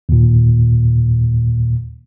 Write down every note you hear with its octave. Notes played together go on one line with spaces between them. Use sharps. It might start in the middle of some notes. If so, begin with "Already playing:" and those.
D#2 A#2